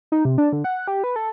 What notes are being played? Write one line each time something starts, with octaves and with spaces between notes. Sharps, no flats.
D#4
C3
D4
D3
F#5
G4
B4
A4